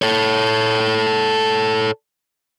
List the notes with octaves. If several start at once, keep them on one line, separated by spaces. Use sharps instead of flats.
A4 C#5